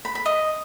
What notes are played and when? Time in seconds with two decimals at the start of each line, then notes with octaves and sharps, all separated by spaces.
0.05 B5
0.15 B5
0.26 D#5